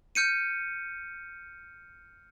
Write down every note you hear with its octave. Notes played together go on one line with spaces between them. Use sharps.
F6 G6 C#7 D#7